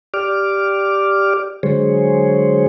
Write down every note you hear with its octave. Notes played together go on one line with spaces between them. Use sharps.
G4 D5 D6 F6
D3 F#3 G#3 G#4 C5 C#5